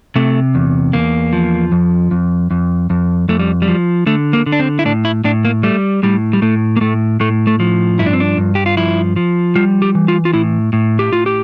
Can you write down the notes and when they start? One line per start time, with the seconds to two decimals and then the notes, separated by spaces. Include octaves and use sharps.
0.16 C3 A3
0.55 E2
0.93 E2 A#3
1.33 F3
1.72 F2
2.11 F2
2.51 F2
2.90 F2
3.29 F2 A3
3.40 G3
3.62 G3
3.68 F3
4.06 D3 A3
4.33 A#3
4.46 D3
4.52 D4
4.59 C4
4.79 E4
4.85 A2 D4
5.05 E4
5.24 A2 D4
5.45 A#3
5.63 G3 A3
6.03 A2 G3
6.33 G3
6.42 A2 A3
6.77 A#3
6.81 A2 A3
7.20 A2 A3
7.47 A3
7.60 F3
7.99 G2 E4
8.06 D4
8.13 C4
8.20 D4
8.38 G2
8.55 G4
8.66 F4
8.77 F3 E4
9.16 F3
9.55 G3 F4
9.82 G4
9.95 E3
10.08 F4
10.25 F4
10.33 A2 E4
10.73 A2
10.99 G4
11.13 A2 F4
11.26 G4